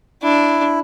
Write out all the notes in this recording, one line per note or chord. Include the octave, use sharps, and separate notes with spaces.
D4 E4